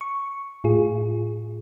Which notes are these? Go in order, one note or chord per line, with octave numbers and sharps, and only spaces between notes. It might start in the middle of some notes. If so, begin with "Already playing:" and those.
C#6
A2 F4 G#4